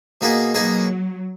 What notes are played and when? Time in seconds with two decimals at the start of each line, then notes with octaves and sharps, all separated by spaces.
0.21 B2 A#3 D#4 G#4 B4
0.54 B2 F#3 A#3 D#4 G#4 B4